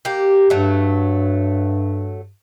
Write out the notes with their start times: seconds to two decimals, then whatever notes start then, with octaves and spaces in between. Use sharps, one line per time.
0.05 A#3 G4
0.50 G2 F#3 A3